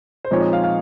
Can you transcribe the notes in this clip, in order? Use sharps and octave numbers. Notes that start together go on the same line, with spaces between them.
C5
A#2 F3 G#3 C4 D#4 C#5
D#5
F5
F5